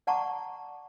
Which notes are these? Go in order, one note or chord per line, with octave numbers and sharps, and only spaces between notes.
D5 F#5 A5 A#5 C#6 D6